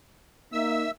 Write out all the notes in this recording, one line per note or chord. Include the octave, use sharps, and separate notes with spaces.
A#3 D#4 E5 E6